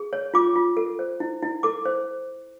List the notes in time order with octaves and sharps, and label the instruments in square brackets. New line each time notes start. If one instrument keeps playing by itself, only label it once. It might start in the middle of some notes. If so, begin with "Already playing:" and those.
Already playing: [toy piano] G#4
C#5
F4 D6
F4
A4
C5
E4
E4
A4 D6
C5